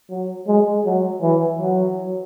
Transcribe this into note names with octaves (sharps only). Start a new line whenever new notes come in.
F#3
G#3
F#3
E3
F#3